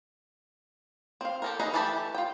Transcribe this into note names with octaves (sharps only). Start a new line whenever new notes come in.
C4 F5
G4 A4 A#4
D#4 E4 G#4 B4 A#5
E3 A3 G4 A5 B5
F4 G5